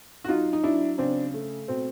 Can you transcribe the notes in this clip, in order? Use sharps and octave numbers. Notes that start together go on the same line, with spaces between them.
F#4
F#3 D#4 F4
D#4
F#3 D4 E4
C#3 C4 D4
A3
B2 C4